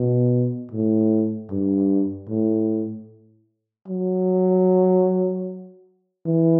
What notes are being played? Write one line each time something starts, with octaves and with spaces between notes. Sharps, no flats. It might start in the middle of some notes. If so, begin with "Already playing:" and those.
Already playing: B2
A2
G2
A2
F#3
E3